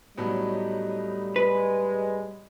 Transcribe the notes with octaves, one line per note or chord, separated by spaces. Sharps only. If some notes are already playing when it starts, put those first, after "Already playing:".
A2 F#3 G3 A3 B3 D#4
G#3 B4